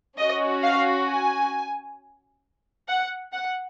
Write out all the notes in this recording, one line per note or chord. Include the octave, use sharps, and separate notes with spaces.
C#4 F#4 D#5
F5
G#5
F#5
F#5